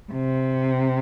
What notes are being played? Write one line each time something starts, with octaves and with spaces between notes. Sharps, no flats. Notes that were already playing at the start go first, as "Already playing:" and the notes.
C3